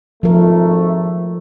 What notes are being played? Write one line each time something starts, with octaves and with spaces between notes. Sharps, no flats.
G#1 F3 A3 A#4